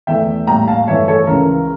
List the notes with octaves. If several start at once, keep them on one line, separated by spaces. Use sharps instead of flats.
E2 E3 A3 E5 G5
A2 G3 A#3 G5 A#5
F5 A5
G2 E3 A3 C#5 E5
A4 C#5
C#2 C#3 E3 A#4